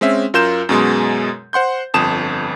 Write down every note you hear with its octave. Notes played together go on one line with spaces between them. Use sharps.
G#3 C4 C#4 E5
F#2 F4 A#4 C6 G6 E7
F#2 B2 G#3 C6
C5 F#5 C6 G6
G1 F2 A5 D#6 E7